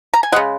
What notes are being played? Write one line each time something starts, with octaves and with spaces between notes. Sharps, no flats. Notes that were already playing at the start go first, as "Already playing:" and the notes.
A#5
G#5
C#3 G#3 D#5 F#5